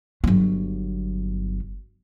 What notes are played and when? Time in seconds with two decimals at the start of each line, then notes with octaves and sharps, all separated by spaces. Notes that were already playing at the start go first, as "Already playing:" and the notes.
0.24 G1 F#3